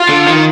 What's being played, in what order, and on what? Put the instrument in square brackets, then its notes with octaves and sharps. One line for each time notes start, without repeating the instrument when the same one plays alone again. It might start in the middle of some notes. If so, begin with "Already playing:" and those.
Already playing: [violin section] F4
[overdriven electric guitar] D3
D#3